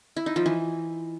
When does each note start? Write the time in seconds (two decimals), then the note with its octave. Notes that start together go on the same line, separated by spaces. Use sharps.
0.17 E4
0.26 D#4
0.36 F3
0.46 E3